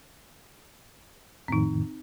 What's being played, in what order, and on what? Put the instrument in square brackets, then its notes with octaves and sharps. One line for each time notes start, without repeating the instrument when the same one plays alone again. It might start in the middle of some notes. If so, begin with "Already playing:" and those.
[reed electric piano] F2 A2 D#3 [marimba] C4 D#4